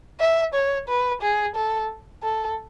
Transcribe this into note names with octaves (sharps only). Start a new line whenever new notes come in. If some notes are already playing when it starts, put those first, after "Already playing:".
E5
C#5
B4
G#4
A4
A4